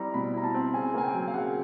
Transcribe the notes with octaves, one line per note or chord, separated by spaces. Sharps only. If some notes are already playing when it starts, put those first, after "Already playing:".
Already playing: G3 C4 E4 A#5
B2 B5
E4 A#5
A5
C4
C#3 G#5
A#3 G#5
G5
F#3
F5
C#3 F#5